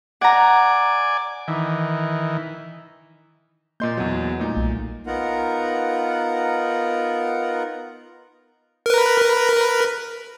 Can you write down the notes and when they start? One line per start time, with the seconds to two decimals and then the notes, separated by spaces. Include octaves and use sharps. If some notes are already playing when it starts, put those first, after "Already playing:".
0.21 D5 F#5 G#5 A#5 D6
1.48 D#3 E3
3.80 A#2 A#3 D#5 C6 G6
3.97 E2 B2 F#3
4.40 A#2 G3 A3 A#3 D#4
4.57 B1
5.07 B3 D#4 F4 A#4 F#5 A#5
8.86 A#4 B4